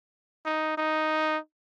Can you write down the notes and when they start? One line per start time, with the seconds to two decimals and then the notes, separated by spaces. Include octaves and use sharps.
0.45 D#4
0.77 D#4